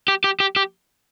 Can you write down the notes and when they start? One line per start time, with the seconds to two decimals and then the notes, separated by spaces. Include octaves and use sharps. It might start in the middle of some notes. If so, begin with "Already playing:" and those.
0.08 G4
0.24 G4
0.40 G4
0.56 G4